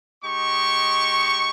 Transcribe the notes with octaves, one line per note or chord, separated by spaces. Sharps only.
G#3 D#4 G4 C#6